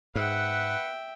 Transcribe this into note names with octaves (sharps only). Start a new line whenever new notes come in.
G#2 B4 E5 F#5 G5